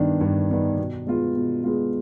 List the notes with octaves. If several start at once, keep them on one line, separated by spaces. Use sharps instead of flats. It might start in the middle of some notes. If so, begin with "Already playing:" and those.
Already playing: G2 D#3 B3 D4
G2
D#3 B3 D4
B2
G#3 B3 F4
B2
G#3 B3 F4